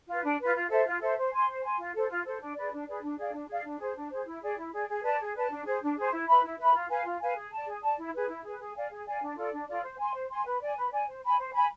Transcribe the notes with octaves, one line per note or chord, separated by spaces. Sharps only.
F4 B4
D4
F4 B4
F4
A4 C5 E5
F4
A4 C5 E5
C5
G#5 C6
C5
G#5 C6
F4
A4 C5
F4
A4 C5
D4
G#4 B4 D5
D4
G#4 B4 D5
D4
G#4 D5 F5
D4
G#4 D5 F5
D4
G#4 C5
D4
G#4 C5
E4
G#4 D5
E4
G#4 D5
G#4
B4 D5 A5
G#4
B4 D5 A5
D4
G#4 C5
D4
G#4 C5
E4
B4 E5 B5
E4
B4 E5 B5
F4
B4 F5 G#5
F4
B4 F5 G#5
G#4
D5 A5
G#4
D5 A5
E4
G#4 B4
E4
G#4 B4
G#4
D5 F5 G#5
G#4
D5 F5 G#5
D4
F4 A4 D5
D4
F4 A4 D5
C5
G#5 C6
C5
G#5 C6
B4
D5 G#5
B4
D5 G#5
C5
G#5 B5
C5
G#5 B5